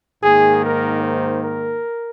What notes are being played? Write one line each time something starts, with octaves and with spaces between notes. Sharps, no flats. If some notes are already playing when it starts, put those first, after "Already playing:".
G#2 D#3 A#3 G#4
A#4
C5
A#4